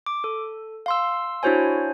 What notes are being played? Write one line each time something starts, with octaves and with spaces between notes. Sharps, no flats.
D6
A4
F5 C6 E6
D4 E4 F#4 C5 C#5 G#5